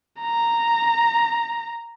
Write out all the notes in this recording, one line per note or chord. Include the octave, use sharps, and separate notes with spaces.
A#5